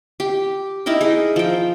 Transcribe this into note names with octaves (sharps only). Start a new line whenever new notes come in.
G4
D#4 E4 A#4 G5
G#4
F3 G5